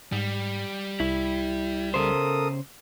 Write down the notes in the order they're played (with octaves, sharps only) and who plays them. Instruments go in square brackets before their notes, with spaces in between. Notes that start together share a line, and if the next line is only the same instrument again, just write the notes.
[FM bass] G#2 [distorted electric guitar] G3
[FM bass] C2 [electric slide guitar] E4
[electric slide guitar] C#3 C5 [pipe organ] A4 A#4 D#6